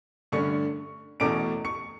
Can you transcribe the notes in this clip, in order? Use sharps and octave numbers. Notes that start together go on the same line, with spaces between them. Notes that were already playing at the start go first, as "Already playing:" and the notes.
G2 D3 A3 C#4 C#6 C#7
E2 B2 A3 C#4 D6 D7
C#6 C#7